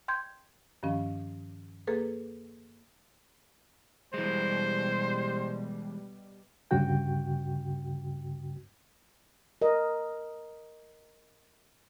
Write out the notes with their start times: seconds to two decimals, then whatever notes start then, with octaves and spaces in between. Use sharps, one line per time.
0.08 G5 C6 G6 G#6
0.83 G2 D#3 F3 C#4
1.87 A#3 G#4 A4 B4
4.14 B2 E3 G3 G#3 C5
6.71 D2 G2 C#3 F#4 G5
9.62 A#4 D#5